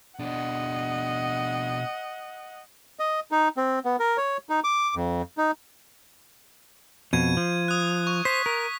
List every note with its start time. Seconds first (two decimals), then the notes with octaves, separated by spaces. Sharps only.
0.20 B2 D4 D#5 F#5
2.99 D#5
3.31 D#4
3.57 C4
3.85 B3
4.00 A#4
4.17 C#5
4.49 D#4
4.64 D6
4.95 F2
5.38 D#4
7.13 F2 B2 G#6 D#7
7.37 F3
7.68 D#6 F#6
8.07 C#6
8.25 C5 B6
8.46 A#4